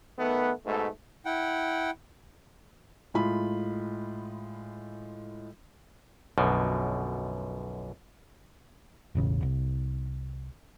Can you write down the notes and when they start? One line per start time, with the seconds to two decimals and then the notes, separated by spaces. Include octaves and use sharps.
0.19 D#3 A3 B3
0.66 G#2 B2 A3
1.25 E4 F#5 G5
3.14 A2 G#3 F4 B5
6.38 B1 F#2 B2 D3 F3
9.15 E1 A1 C#3
9.42 C2